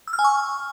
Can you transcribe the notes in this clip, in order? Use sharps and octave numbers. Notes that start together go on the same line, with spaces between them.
E6
F6
G#5
C#6